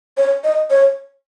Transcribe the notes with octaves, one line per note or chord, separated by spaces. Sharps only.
C#5
D#5
C#5